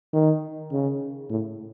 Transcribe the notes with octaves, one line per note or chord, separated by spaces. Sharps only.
D#3
C#3
A2